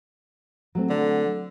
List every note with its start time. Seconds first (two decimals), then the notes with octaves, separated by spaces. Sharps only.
0.75 F#3 A3 C4
0.90 D3